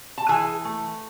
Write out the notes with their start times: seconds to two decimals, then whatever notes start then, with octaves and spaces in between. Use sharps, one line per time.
0.18 A5
0.29 E3 G#4 G#5
0.65 A3